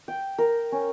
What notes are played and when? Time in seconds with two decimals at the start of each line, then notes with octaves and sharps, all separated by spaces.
0.08 G5
0.38 A#4
0.72 C#4